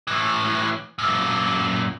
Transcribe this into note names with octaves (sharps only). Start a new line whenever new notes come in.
A2 E3
F#2 A#2